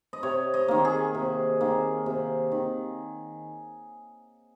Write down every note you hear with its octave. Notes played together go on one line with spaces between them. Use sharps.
D#5
C3 C#5
D#5
D#3 A#3
G#4
C3
D#3 A#3
C3
D#3